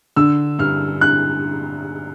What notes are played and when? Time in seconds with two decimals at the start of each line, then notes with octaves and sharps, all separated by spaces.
0.16 D3 E6
0.59 G2 F6
1.01 F#6